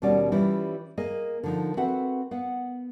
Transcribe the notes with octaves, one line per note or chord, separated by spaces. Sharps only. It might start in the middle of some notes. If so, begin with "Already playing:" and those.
D#2 B2 G3 C#4 F#4 D5
E3 G3 C#4 E4 F4
A#3 G#4 D#5
D3 F3 D#4
C4 F#4 A4 B4 E5 F#5
B3 F5 F#5